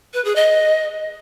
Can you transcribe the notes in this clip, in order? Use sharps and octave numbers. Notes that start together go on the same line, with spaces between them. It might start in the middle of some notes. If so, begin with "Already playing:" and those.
B4
G#4
D#5